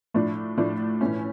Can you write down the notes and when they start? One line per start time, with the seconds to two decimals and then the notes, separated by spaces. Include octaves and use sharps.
0.14 A2 F3 A3 D4
0.57 A2 F3 A3 D4
1.01 A2 E3 A3 C#4